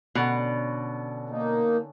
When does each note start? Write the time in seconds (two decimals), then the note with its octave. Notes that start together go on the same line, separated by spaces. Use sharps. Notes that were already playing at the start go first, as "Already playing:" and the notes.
0.15 B2 D3 C#4
1.29 A#3 D#4